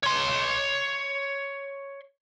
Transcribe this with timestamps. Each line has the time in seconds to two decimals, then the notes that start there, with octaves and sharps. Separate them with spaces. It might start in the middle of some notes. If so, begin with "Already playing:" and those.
0.04 C#5 C6